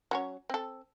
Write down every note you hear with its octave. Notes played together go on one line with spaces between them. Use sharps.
F#3 C#4 C#5
C4 A4